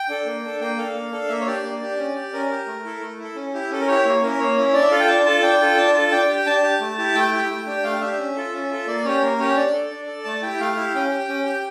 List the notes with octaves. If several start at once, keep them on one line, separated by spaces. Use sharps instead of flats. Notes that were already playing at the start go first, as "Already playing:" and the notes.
Already playing: G5
D4 A4
A#3
D4 A4
A#3 G5
D4 A4 F5
A#3
D4 A4
A#3 E5
C#5
D4 G4 D5
A#3
D4 G4
C#4
G4
C#4 A#4
G4
A3
E4 A4
A3
E4
A4
C#4
E4 G4
C#4 A4
A#4
E4 G4 C#5
A#3 C#5
C#4 E4 A#4
A#3 C#5
C#4 E4
D4 D5
E5
F4 A4 F5
G5
D4 A5
F4 A4 A5
D4 G5
F4 A4
D4 A5
F4 A4 A5
D4 G5
G4
D4 A5
G4
A3
E4 G4
A3 G5
E4 G4
A3
D4 G4
A3 F5
D4 G4 E5
C#4
F4 A4
C#4
F4 A4
A#3 D5
C#4 G4 C#5
A#3 A#4
C#4 G4 C#5
D4 D5
A4
D4
A4
A3 A5
E4 G4 G5
A3 F5
E4 G4
C#4 G5
G4
C#4
G4